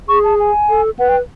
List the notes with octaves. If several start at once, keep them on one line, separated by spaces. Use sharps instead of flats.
G#4 C#6
A5
G#5
A4
B4 F#5
G5